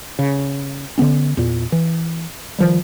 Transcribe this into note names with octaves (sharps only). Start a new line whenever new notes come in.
C#3
D3 E3 B3 C#4
E2 A#2
E3
D#3 F3 G3